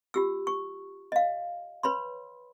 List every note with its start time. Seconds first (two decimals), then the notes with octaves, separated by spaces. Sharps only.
0.14 F4 G4 E6
0.47 C#6
1.12 D#5 F5
1.83 B4 C#5 B5 C6